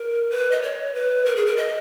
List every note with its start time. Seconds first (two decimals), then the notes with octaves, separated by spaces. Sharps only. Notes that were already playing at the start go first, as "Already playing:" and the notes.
Already playing: A#4
0.31 B4
0.52 D#5
0.62 C#5
0.94 B4
1.26 A#4
1.36 G#4
1.46 A#4
1.57 D#5